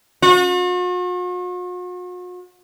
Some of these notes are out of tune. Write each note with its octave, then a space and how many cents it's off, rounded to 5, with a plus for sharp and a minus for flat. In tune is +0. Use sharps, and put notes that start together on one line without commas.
F#4 -45